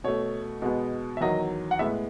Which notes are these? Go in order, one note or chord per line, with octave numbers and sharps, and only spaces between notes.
B2 A3 C#5
B2 G#3 B3
E5
E2 D#3 F#3 D#5
F#5
A2 G#3 B3 E5